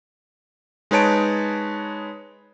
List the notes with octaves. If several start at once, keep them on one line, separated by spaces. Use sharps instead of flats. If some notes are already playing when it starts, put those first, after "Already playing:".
G#3 D#4 B4 C#5 A5 D7